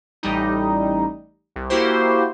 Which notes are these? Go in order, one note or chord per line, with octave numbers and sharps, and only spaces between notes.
A1 G3 D#4
C2
A#3 E4 F#4 G4 C5